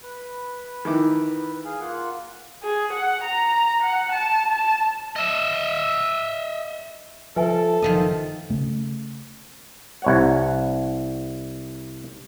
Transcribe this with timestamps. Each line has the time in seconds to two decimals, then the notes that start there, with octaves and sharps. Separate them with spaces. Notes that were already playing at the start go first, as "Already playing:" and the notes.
0.03 B4
0.85 D#3 E3 D6
1.65 G#4 F5 G#5
1.81 A#3 F4 F#5
2.63 G#4
2.93 F#5
3.23 A#5
3.82 F#5
4.12 A5
4.56 A5
5.16 D#5 E5
7.36 F3 A4 B4 E5 G#5
7.82 F#1 D#3 F3 D#5
8.50 C#3 A3
10.02 C2 C#5 F#5